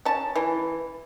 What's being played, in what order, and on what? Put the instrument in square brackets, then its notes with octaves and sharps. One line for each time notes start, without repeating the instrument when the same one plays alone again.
[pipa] C#4 A5
E3